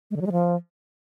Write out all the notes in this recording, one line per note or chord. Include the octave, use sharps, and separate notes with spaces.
G#3
D3
F#3
G#3
F3